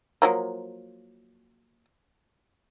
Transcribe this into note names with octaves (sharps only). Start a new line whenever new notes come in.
F3 F#3 A#3